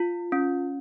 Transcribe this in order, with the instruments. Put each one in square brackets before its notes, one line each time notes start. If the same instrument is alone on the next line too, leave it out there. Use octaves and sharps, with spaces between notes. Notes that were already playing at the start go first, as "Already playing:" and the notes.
Already playing: [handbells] F4
C#4